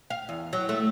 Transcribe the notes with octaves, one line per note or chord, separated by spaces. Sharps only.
F5
E2
F#3
A3